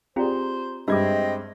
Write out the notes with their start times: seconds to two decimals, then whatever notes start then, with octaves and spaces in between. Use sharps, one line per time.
0.16 C4 F4 G4 G#4 C5 D5 A#5
0.88 G2 G#3 C4 D#5 E5 B5 D6 G#6